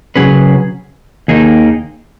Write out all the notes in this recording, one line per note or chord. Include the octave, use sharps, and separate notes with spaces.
C#3 F#3 C#4 G#4 B4
D#2 D#3 A#3 D#4 G#4